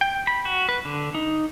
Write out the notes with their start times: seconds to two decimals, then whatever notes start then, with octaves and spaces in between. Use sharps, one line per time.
0.01 G5
0.27 B5
0.45 F#4
0.69 B4
0.85 D3
1.15 D#4